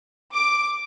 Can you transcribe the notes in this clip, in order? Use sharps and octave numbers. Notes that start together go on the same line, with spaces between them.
D6